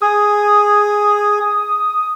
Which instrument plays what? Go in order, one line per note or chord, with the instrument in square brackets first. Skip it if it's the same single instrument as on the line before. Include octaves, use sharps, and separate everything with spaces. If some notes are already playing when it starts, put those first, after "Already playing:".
[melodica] G#4 [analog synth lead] D#6